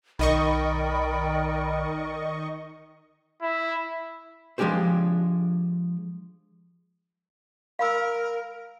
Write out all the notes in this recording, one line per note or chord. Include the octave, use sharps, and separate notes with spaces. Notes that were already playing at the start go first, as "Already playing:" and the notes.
B1 D#3 A#4 D5 D#5 G5 B5 C#6
E4
F3 G#3 D4 G4 G#4 C5
A#4 F5 B5 E6